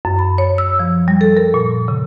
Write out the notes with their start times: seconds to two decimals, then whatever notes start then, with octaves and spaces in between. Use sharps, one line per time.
0.05 F#2
0.19 B5
0.38 C#5
0.58 E6
0.79 F3
1.08 G3
1.21 A4
1.37 A#4
1.54 A#2
1.88 C#3